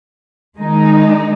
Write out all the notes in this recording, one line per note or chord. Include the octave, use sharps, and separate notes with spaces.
D#3 G#3 D#4